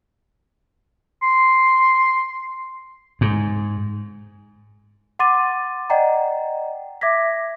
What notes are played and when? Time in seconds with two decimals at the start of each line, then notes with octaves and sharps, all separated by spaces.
1.22 C6
3.21 G#2
5.19 F#5 C6 D6 A6 D#7
5.90 D5 D#5 F#5 G5 A#5
7.01 E5 D6 G#6 A#6 B6